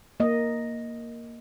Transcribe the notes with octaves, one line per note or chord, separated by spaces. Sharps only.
A#3 D#5